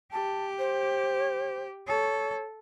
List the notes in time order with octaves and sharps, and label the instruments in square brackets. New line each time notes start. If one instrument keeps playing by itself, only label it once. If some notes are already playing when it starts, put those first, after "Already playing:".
[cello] G4 [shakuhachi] A5
[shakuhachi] C5
[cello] A4 [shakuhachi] C#5